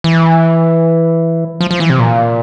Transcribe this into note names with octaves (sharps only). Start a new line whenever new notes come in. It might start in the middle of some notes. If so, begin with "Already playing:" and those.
E3
F3
F3
E3
C3
A#2